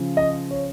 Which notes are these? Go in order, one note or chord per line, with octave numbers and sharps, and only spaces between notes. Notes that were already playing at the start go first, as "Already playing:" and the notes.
Already playing: C#3 F3
D#5
C#5